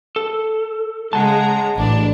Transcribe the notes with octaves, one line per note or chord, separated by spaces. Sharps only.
A4
C#3 G#3 F#5 A5 A#5
A1 D4